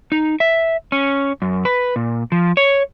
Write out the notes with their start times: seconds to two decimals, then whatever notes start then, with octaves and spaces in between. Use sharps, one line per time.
0.12 D#4
0.40 E5
0.92 C#4
1.42 F#2
1.65 B4
1.96 A#2
2.32 F3
2.57 C#5